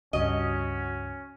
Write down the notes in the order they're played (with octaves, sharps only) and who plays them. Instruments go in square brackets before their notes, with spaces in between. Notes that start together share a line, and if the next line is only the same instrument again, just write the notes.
[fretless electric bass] C#2 G2 [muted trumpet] C#4 [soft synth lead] F#4 [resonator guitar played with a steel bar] D#5